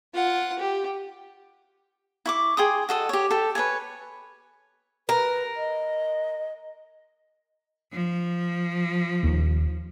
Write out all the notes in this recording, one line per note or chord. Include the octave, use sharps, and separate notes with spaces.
F4 F#5
G4
E4 C#6 D6
G#4 G5 C6 D#6
F#4 A4 D#5
G4 C#5
A4 G5
B4 C#5 D5 G#5
A#4 B4
D#5
F3
D#1 D#2